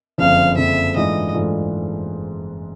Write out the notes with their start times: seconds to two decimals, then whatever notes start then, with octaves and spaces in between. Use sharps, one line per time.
0.18 F#1 F2 D3 F3 F5
0.57 F#1 F2 D3 F3 E5
0.96 G#2 E3 A3 D4 F4 D#5
1.34 G#2 E3 A3 D4 F4